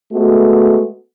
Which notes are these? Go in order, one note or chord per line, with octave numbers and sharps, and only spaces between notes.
G#3 A3 B3 F#4